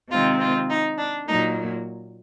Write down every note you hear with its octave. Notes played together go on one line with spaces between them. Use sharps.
C3 D#3 G#3 C4 F4
F4
D#4
D4
A#2 F#3 A#3 D#4